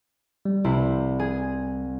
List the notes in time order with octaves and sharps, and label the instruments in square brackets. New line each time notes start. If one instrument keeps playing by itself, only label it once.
[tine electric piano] G3
[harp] C2 E4 C5
G#4